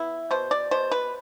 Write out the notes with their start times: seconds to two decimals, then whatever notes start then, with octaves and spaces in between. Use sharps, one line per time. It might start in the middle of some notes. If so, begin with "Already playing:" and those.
Already playing: B3 E4
0.31 B2 C5
0.51 D5
0.71 B2 C5
0.91 B4